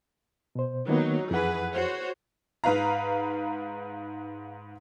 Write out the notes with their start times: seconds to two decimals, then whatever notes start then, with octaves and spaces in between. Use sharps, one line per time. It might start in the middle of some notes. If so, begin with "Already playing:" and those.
0.55 B2 C5
0.88 D#3 F#3 A#3 B3 D#4
1.31 F2 E3 G#4 B4 F#5
1.72 F#4 C5 C#5
2.64 G#2 B4 F5 A#5